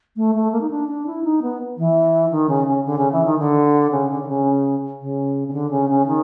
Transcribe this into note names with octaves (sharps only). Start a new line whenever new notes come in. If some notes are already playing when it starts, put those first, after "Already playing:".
A3
A3
A#3
D#4
D4
D4
E4
D#4
B3
E3
D#3
C#3
C#3
D3
C#3
E3
D#3
D3
C#3
D3
D3
C#3
C#3
C#3
D3
C#3
C#3
D#3